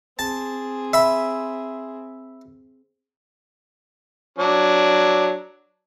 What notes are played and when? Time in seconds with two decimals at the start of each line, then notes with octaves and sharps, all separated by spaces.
0.19 C4 G#4 A5
0.93 E5 B5
4.38 F#3 D4